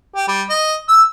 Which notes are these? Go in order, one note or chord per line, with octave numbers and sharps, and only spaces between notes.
G4
G3
D#5
E6